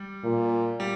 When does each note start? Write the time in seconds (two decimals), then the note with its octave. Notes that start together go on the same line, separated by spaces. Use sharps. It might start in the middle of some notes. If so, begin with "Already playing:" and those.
Already playing: G3
0.24 A#2
0.80 G3